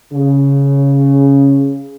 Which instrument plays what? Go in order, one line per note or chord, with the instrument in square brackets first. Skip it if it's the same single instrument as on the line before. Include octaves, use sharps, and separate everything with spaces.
[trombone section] C#3